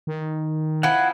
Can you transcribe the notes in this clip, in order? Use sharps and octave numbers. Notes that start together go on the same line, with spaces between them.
D#3
F3 C4 E4 F#5 G#5